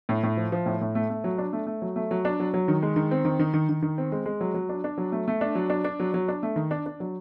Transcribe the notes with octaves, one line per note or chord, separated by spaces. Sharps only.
A2
A2
F3
F3
A2
A2
A3
A3
F#3
D4
A3
A3
F#3
A3
F#3
D4
F#3
F#3
D#3
G#3
D#3
C4
D#3
D#3
D#3
D#3
D#3
C4
G#3
G#3
F#3
F#3
D4
D4
F#3
A3
A3
D4
F#3
D4
D4
F#3
F#3
D4
A3
D#3
D4
D4
F#3